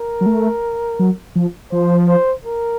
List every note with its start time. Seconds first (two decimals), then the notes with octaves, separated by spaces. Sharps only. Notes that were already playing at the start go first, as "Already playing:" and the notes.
Already playing: A#4
0.21 F#3
0.26 A3
0.99 F#3
1.36 F3
1.71 F3 C5
2.08 C5
2.44 A#4